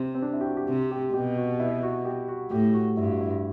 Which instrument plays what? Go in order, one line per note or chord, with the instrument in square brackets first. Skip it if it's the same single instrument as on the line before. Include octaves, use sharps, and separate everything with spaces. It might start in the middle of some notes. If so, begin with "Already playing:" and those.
Already playing: [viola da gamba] C3 [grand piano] C4
[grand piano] C4
D4
E4
G4
F#4
G4
[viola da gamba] C3
[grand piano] G4
[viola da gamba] B2 [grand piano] G4
[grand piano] F#4
E4
F#4
G4
F#4
[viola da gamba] A2 [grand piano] G4
[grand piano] F#4
[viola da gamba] G2 [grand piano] E4
[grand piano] F#4
E4